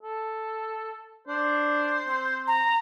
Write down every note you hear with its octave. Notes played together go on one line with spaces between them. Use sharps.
A4
D4 C5
C4
A#5